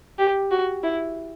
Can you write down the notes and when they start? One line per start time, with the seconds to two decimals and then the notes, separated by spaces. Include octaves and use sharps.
0.19 G4
0.51 F#4
0.83 E4